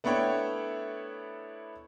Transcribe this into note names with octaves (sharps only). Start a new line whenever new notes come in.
A3 B3 D4 E4 C#5 G5